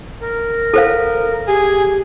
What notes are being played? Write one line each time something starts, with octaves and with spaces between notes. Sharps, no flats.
A#4
A4 C5 F5
G4 G#4 G#5